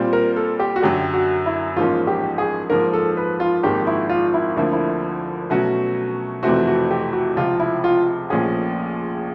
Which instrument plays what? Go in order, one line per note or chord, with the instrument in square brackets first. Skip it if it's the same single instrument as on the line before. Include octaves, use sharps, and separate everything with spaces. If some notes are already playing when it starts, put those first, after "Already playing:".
Already playing: [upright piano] A#2 G3 C4 F4
[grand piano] A#4
A4
G4
F#4
[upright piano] F#2 D3 F#3 [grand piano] G4
[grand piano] F#4
E4
[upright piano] A1 G#2 F3 A#3 C#4 [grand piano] F4
[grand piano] G4
G#4
[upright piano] G#2 F3 A#3 [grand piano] A#4
[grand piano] A4
B4
F4
[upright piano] G#1 G#2 F3 A#3 [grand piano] G4
[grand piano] E4
F4
E4
[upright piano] D2 D3 F3 A#3 [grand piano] E4
[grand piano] E4
[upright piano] B2 F#3 A3 C#4 F#4
[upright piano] F2 C3 E3 A3 C4 [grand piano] F#4
[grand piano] F#4
G4
F#4
[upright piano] C#2 C3 F3 [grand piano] F4
[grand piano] E4
F4
[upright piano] A#1 A#2 F3 A3 C#4 [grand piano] G#4